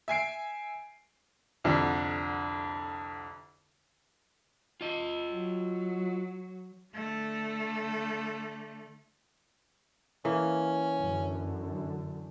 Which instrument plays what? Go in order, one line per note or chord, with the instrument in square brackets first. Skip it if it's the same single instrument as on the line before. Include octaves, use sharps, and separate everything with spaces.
[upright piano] E5 G#5 C7 D7
C2 F2 D3
[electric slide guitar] F4 D#5
[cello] F#3
D3 A3
[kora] E3 A#3 [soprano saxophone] C#4
[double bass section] F#2 D3